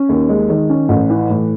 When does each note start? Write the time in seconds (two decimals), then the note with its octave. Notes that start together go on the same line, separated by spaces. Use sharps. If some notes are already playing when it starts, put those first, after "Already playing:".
Already playing: C#4
0.09 D#2
0.29 G#3
0.49 D#3
0.69 C#4
0.89 A1
1.10 E3
1.30 A2